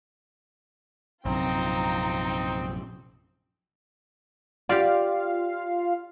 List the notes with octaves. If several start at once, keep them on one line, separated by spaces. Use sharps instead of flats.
A#1 F#2 C3 C4 D#4 F4 G5 A#5
F4 G4 D5 F5